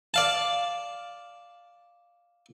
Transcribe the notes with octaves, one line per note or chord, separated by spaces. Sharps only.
D5 F5 A5